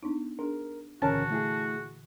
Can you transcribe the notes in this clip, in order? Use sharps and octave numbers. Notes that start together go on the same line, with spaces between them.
B3 D4 D#4
D4 G#4 A#4
C#2 A#2 D3 E3 C#4 F#4 A#4 A5
A3 E4 G#4